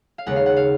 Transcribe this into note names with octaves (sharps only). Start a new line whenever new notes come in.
F5
D#2 C#3 G#3 B3 F#5
F5
F#5
F5